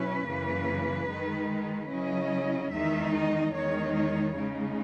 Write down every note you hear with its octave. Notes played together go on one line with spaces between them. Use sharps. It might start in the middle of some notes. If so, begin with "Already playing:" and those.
Already playing: B2 F#3 C#4 E4 B4
F#2 C#3 E3 A#3
D#3 G#3 D#4
C#3 F#3 C#4 E4 D#5
E2 D#3 G#3 D#4 E5
D#5
E2 D#3 G#3 D#4 C#5
C#5
C#3 G#3 D#4